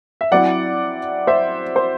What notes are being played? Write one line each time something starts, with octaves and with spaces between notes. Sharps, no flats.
E5
F#3 C4 E4 D5 F#5
C5 E5
C5